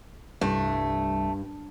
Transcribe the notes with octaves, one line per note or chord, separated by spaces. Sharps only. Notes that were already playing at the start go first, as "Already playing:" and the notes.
C2 G2 A3